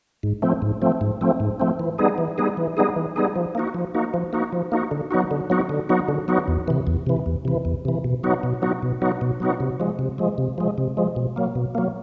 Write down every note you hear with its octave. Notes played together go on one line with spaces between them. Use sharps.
G#2
F3 A3 C4
G#2
F3 A3 C4
G#2
F3 A3 C4
G#2
F3 A3 C4
E3
G3 B3 D#4 G#4
E3
G3 B3 D#4 G#4
E3
G3 B3 D#4 G#4
E3
G3 B3 D#4 G#4
F3
A#3 D#4 F#4
F3
A#3 D#4 F#4
F3
A#3 D#4 F#4
F3
A#3 D#4 F#4
D3
F#3 B3 D#4 F#4
D3
F#3 B3 D#4 F#4
D3
F#3 B3 D#4 F#4
D3
F#3 B3 D#4 F#4
E2
C3 E3
E2
C3 E3
E2
C3 E3
E2
C3 E3
B2
F#3 B3 D#4 F#4
B2
F#3 B3 D#4 F#4
B2
F#3 B3 D#4 F#4
B2
F#3 B3 D#4 F#4
C3
F3 G#3
C3
F3 G#3
C3
F3 G#3
C3
F3 G#3
B2
F#3 A#3
B2
F#3 A#3